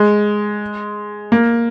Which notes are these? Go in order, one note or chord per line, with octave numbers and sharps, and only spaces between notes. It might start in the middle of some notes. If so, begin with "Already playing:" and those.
Already playing: G#3
A#3